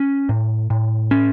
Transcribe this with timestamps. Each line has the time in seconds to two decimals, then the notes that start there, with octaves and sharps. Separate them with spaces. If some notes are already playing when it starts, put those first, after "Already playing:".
Already playing: C#4
0.29 A2
0.70 A2
1.11 C#4